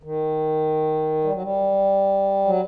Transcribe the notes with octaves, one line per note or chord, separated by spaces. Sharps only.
D#3
G3
F#3
G3
F#3